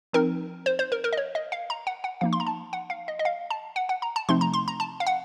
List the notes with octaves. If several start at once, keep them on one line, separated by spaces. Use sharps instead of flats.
F3 C4 D#4 A#4
C5
C5
A#4
A#4
D#5
C#5
D#5
F5
A#5
F#5
F#5
F3 A#3 D#4 F5
C6
A#5
A5
F#5
F5
D#5
D#5
F5
A5
F#5
F#5
A#5
A5
C3 F3 A3 C4 D#4 C6
A#5
C6
A#5
A5
F5
F#5